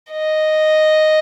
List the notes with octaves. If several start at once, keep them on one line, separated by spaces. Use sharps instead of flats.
D#5